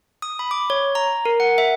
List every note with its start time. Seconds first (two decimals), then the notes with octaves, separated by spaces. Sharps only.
0.22 D#6
0.39 B5
0.51 D6
0.70 C#5
0.95 A#5
1.25 A#4
1.40 F#5
1.58 E5